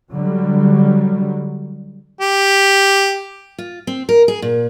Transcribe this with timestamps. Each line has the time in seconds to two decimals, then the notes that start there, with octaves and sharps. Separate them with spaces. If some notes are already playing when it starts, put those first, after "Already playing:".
0.11 D3 F#3 G3
2.21 G4
3.58 F4
3.87 C4
4.09 A#4
4.28 G#4
4.42 A#2